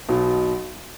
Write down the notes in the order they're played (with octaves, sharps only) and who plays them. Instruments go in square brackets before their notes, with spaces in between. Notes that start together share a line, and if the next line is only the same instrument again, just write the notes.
[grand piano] B1 B2